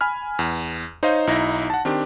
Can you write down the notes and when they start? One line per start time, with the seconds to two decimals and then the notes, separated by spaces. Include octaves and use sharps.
0.01 G#5 B5 F6
0.39 E2
1.03 D#4 C5 C#5 D#5 F5
1.27 B1 D#4 E4 A#6
1.70 F#5 A5
1.85 D#3 C4 D4 G4